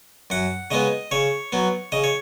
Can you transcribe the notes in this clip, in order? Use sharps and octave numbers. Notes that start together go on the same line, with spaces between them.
F#2 F#5
C#3 G#3 B3 D#5
C#3 C#5
F#3 B3
C#3 D#5
C#5